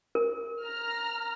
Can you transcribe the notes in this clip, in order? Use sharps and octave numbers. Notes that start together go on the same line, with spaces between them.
A#4
A#5 F6